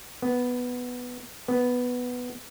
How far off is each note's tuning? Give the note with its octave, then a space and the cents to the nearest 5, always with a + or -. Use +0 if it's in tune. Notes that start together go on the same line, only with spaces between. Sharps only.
B3 +0
B3 +0